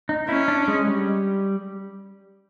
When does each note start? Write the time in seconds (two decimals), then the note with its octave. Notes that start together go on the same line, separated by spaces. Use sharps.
0.09 D#4
0.28 C#4 E4
0.48 D4
0.68 G#3
0.87 G3